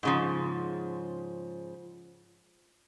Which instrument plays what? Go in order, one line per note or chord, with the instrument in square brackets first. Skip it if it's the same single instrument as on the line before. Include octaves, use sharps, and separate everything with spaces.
[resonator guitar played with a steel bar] G#2 C#3 F3